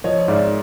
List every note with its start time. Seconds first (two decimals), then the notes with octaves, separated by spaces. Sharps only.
0.04 F3 C#5 D#5
0.28 G#2 D5 E5